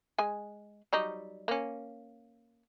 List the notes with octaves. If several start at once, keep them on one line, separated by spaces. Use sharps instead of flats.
G#3 G#5
F#3 G3 D#4
A#3 C#4